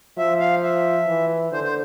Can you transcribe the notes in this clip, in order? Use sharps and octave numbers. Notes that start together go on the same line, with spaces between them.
F3 E5
F5
E5
E3
D3 C5
C5